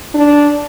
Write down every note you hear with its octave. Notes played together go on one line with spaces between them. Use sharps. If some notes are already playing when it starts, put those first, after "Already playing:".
D4